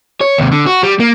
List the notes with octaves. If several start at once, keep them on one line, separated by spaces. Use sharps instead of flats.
C#5
D#2 C3
D3
F#4
G3
A#3